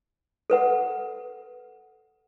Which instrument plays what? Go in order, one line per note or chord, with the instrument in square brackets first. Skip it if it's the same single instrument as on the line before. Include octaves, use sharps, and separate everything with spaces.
[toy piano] A4 B4 F#5